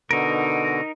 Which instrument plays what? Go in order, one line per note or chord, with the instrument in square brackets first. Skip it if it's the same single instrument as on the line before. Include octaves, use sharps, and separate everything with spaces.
[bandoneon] B2 D3 [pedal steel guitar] D#4 A#4